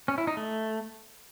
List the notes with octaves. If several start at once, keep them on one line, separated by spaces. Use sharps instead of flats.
C#4
E4
D#4
A3